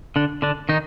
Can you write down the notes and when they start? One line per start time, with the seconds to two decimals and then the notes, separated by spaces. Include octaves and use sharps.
0.16 D3 D4
0.42 D3 D4
0.69 D#3 D#4